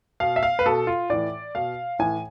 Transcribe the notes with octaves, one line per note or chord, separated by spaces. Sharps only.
B2 F5
E5
F5
B4
B2 A4
F4
A2 E3 D5
B2 F5
A2 E3 G#5